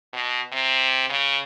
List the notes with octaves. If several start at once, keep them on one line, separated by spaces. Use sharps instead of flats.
B2
C3
C#3